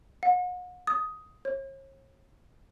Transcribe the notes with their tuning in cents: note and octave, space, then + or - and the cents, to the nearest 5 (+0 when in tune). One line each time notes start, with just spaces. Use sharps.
F#5 -40
D#6 +10
C#5 -40